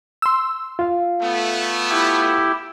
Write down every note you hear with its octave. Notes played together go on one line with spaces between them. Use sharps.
C6 E6
F4 F5
A3 B3
E4 G4